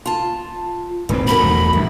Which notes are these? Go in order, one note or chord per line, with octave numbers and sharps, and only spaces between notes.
F4 A5
D#1 G#2 C4 B4
D2 B2 A#4 B5
E2 A3
A#1 G2 B2 E4